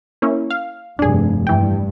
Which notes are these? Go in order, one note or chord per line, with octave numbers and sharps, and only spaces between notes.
A#3 C#4 E4
F5
F1 G2 D4 G#4
G2 E3 G5